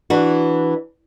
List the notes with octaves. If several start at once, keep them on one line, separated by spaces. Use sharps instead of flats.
E3 D4 F#4